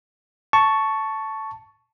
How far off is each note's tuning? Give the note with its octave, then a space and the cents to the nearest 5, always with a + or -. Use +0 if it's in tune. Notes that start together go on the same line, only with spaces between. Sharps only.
A5 +0 C#6 +5